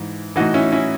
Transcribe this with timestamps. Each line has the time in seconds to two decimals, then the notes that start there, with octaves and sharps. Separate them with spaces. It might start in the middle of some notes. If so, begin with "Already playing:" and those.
Already playing: G#2 E3
0.36 A2 E3 D#4 F#4
0.54 C#4 E4
0.72 C#4 E4